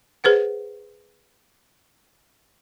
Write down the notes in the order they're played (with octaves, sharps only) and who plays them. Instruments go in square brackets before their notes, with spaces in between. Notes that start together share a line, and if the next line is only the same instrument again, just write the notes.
[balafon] G#4 B4 C5 F#5